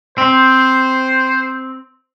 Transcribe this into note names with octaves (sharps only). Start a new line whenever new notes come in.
C4 C5